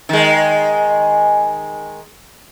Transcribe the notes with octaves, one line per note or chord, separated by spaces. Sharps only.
D#3 G#3